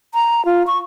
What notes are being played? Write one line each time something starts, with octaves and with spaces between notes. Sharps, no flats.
A#5
F4
C#6